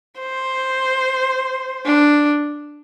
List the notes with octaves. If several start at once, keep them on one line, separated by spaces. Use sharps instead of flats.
C5
D4